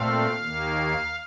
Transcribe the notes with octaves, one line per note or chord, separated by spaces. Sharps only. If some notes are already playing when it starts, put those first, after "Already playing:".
Already playing: A#2 A3 C4 F5
D#2 D#3 A#3